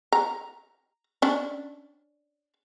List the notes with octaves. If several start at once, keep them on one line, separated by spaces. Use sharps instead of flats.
A#5
C#4 D4